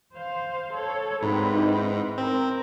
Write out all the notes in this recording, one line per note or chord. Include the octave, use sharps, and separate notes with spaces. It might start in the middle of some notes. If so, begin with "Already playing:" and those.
C5 F5
A4 C#5
G#2 C4 B4 A#5
D#4 E4 D#5
C4 A#4